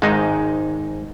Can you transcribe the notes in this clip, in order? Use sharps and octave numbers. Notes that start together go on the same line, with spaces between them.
G#1 G#2 G#3 D#4